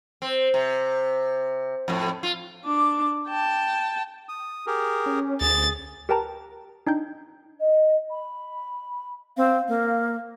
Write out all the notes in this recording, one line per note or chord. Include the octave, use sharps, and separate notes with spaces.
C4
C3
F2 A2
F4
D4 D6
G5 A5
D#6
G4 G#4 A#4
C#4
D2 G#4 A6
G4 A#4 B4 G5 A5 A#5
D4 D#4 G5 G6
D#5
B5
C4 F5
A#3